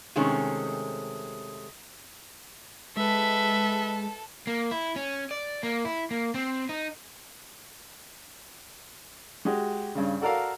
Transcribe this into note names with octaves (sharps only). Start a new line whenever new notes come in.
C3 D#3 G#3 A3 C4 C#4
G#3 A4 B4 E5
A#3
E4
C#4
D5
A#3
E4
A#3
C4
D#4
G#3 F#4 G4
G2 C#3
F#4 A4 A#4 D5 F5